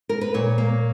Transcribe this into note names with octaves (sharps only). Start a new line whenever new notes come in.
A#4
B4
A#2 C#5
A#3